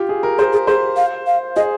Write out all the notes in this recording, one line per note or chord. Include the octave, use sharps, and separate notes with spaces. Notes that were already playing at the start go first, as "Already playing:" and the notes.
Already playing: F4 G4
G#4
A#4
G#4 C5
G#4
G#4 C5
F5
F5
G#4 D#5